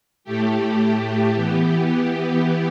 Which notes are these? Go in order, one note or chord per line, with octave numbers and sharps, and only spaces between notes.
A2 A3 G4
E3 B3 G4